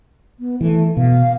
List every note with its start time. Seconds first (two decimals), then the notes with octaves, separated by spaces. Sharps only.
0.39 B3
0.61 E3 A3
0.97 B2 F5